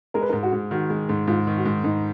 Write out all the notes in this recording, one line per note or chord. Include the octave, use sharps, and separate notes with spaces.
G#3 A#4
B4
A#4
G#2
F#4
G#2
D#3 F#4
G#3
G#2
G#2 F4
D#3
F#4
G#2
G#2 D#4